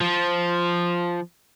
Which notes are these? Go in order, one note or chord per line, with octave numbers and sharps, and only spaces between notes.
F3